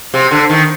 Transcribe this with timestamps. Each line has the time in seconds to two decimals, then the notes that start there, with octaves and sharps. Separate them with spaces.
0.14 C3
0.31 D3
0.50 D#3